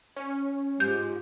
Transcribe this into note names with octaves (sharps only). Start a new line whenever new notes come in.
C#4
G#2 F4 G4 G6